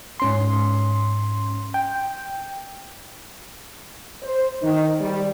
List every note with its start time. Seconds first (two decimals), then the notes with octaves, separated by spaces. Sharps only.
0.20 G#2 C#4 C6
1.74 G5
4.23 C5
4.63 D#3
5.00 G3